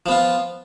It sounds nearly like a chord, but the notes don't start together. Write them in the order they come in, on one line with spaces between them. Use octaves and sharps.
F3 B3 F4